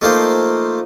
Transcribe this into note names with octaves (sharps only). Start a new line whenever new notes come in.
F3 A3 A#3 D#4 C5 D#5